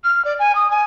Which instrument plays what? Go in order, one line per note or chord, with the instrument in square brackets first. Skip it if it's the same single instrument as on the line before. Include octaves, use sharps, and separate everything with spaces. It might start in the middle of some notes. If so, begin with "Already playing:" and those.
[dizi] F6
D5
G#5
D#6
G#5